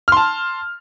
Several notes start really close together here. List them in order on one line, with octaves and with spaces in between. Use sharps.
F6 C6 A5